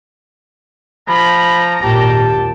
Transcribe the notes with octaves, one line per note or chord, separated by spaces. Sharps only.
F3 A#5 B5
G#1 D#2 A#2 G4 A5